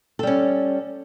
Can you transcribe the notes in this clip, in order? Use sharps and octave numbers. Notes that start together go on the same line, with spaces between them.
G3 C#4 A4